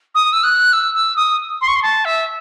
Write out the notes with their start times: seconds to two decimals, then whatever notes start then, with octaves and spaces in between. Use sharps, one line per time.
0.15 D#6
0.33 E6
0.44 F#6
0.73 E6
0.95 E6
1.16 D#6
1.61 C6
1.68 C#6
1.75 C6
1.82 A5
2.05 E5